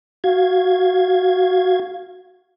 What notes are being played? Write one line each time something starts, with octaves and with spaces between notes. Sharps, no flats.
F#4 F5 G#6